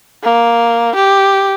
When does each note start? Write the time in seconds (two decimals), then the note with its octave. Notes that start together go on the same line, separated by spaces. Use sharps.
0.23 A#3
0.95 G4